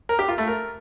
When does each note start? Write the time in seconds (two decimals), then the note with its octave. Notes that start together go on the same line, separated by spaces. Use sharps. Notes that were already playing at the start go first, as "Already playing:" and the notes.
0.09 A#4
0.19 G4
0.28 F4
0.38 A3
0.48 A#4